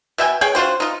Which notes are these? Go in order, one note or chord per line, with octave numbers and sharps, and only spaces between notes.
B2 E5 G5 G#5
G#4 C#5 G5
D4 F4 F#4 C5
D#4 F4